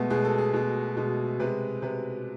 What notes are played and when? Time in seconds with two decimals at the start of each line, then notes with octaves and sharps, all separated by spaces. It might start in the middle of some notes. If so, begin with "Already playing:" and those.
Already playing: B2 G#3 A3 B3
0.10 B2 G#3 G#4
0.25 A4
0.38 G#4
0.54 B2 G#3
0.97 B2 G#3
1.40 C3 G#3 B4
1.82 C3 G#3 B4